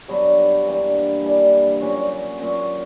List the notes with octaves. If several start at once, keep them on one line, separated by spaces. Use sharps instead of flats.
G2 F#3 B3 D4
E3 G3 A#3 D4
E3 G3 A#3 D4
A#2 F#3 C#4 F#4
A#2 F#3 C#4 F#4